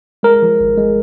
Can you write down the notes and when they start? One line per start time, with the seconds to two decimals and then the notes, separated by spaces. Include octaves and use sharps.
0.23 G#3 A#4
0.42 F3
0.60 G#1
0.78 G#3